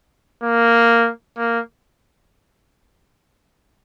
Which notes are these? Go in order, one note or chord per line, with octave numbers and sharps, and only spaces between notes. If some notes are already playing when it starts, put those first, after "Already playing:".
A#3
A#3